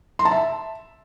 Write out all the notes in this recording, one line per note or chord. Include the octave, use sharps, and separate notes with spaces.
C6
A5
E5